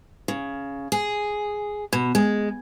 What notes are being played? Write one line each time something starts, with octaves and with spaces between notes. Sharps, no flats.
C#3
G#4
B2
G#3